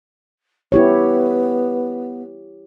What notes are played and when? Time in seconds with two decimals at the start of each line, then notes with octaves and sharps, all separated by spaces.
0.72 B3 E4 G4 C#5